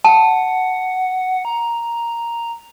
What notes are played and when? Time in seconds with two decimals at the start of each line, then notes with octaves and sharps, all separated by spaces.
0.04 F#5 A5
1.45 A#5